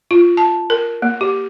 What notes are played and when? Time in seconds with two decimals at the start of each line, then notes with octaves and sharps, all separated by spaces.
0.11 F4
0.37 A5
0.70 A#4
1.02 A#3
1.21 G4